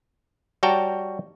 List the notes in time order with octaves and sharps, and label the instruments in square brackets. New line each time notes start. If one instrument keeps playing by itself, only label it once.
[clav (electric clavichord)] G3 F#4 C#5 G5 A5 A#5